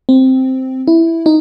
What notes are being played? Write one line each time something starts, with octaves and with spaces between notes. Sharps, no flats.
C4
E4
D#4